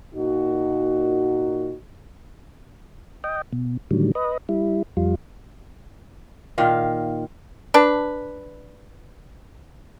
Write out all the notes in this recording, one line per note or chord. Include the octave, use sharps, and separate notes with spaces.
A#2 D#4 F#4
D#5 G5
B2
A2 D3 D#3 F#3 G3
B4 D#5
G3 E4
F2 G3 F4
A#2 D#3 F5
D4 B4